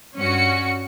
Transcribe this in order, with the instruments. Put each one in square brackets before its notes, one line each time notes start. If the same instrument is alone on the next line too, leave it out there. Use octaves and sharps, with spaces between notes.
[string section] G2 C#4 F#4 C#7